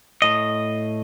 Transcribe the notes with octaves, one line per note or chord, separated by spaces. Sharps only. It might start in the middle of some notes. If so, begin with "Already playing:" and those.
A2 D#5